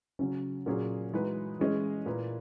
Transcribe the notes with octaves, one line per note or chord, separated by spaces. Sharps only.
C#3 F#3 C#4
A#2 F#3 C#4 G#4
E3 G#3 D#4 F#4 B4
E3 G#3 C#4 G#4 D#5
A#2 A#3 E4 B4